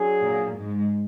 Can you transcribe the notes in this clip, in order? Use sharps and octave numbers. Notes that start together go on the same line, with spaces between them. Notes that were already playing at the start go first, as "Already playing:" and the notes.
Already playing: F#3 D4 G#4
A#2 A#3
G#2 G#3